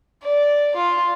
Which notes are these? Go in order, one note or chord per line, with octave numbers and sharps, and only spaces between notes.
D5
F4